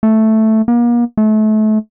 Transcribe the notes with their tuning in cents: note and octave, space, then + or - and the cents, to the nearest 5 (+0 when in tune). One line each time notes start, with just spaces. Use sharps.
A3 +0
A#3 +40
A3 -30